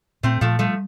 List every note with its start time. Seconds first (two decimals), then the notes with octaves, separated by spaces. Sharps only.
0.23 A#2 A3 C4
0.41 A#2 F3 A3
0.59 F3 G3 A3